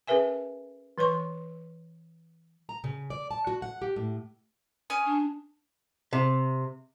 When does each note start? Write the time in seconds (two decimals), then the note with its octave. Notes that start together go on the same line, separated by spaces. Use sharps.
0.07 C#4 G#4 A#4 B4 E5 G#5
0.98 E3 B4 C#5 C6 C#6
2.69 A#5
2.84 C#3
3.10 D5
3.31 A5
3.47 F#4
3.62 F#5
3.82 G4
3.96 A2
4.90 C#4 G#5 D#6
5.06 D4
6.13 C3